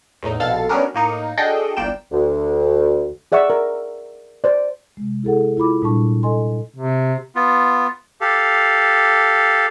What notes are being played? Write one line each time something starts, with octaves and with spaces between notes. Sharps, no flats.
E2 A2 D#4
A#1 B2 A4 F5 A6
F#3 G3 B3 C#4 D4 A#4
A2 A#3 D#4 C#7
D4 F#4 G#4 A4 D#5 G5
G1 C2 A#3 D5 G5 E7
D2
G#4 D5 E5 F#5 C#6 E6
A#4
C5 D5
C3 G#3
E4 G#4 A4 F#5
E4 F4 B5 D6
A#2 G3 D4 A5 C#6
A4 D#5 G#5 C6
C3
B3 F4
G4 A4 F5